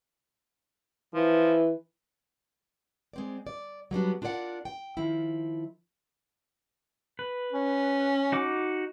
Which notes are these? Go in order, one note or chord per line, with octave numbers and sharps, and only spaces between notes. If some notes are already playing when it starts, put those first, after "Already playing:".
E3 F3
G#3 C4 D5
D5
F#3 G3 B3 D4
D4 F4 A#4 D5 F#5
G5
D#3 F3 E4
B4
C#4
D#4 F#4 D6